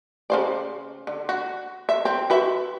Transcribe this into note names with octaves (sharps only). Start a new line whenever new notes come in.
C#3 C5 D5
D3
F#4
E5
C4
F#4 B4 E5